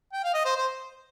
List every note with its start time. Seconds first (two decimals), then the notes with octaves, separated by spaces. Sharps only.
0.13 G5
0.24 F5
0.34 D#5
0.45 C5
0.56 C5